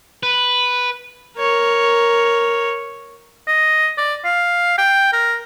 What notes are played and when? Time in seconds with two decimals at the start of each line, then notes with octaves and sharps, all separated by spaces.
0.23 B4
1.38 A#4 C#5
3.48 D#5
3.98 D5
4.24 F5
4.78 G5
5.13 A#4